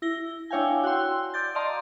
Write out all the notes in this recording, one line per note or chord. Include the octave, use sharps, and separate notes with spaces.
E4 A#6 G7
D4 E4 C#5 F5 G5 G#5
F#4 F#5 G5 C6 E6
D5 G6 A6
D5 D#5 F5 A5 A#5 C6